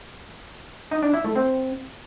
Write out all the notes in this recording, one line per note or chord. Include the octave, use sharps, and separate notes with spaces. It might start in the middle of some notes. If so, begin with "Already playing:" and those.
D#4
D4
E4
A3
C4